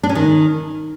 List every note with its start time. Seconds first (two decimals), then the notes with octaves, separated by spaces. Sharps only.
0.03 D4
0.09 C#4
0.15 D#3